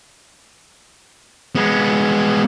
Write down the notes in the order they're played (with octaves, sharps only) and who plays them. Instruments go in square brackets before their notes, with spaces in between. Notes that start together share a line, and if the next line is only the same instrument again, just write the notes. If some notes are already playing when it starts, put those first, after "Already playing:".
[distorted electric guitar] G#3 B3